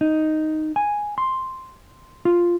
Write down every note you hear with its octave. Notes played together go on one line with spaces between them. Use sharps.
D#4
G#5
C6
F4